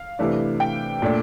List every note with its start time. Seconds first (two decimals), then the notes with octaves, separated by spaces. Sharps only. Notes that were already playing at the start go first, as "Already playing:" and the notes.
Already playing: F5
0.19 C3 E3 A3 D4
0.60 G5
1.02 A#2 A3 D4